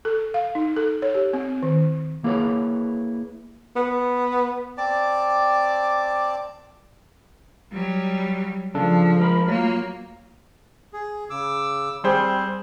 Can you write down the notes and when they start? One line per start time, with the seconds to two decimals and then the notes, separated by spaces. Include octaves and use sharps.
0.05 A4
0.34 F5
0.55 D#4
0.76 A4
1.02 C#5
1.14 G4
1.33 C4
1.63 D#3
2.24 A#3 E4 G#4 A4 B4 C#5
3.76 B3
4.78 C4 D5 A5 D6
7.72 F#3 G3
8.75 C#3 F3 D4 A4
9.19 G#3 A#4 B5
9.48 F#3 A#3 F4
10.93 G#4
11.30 C#3 D6 E6
12.04 G3 C4 G#4 C5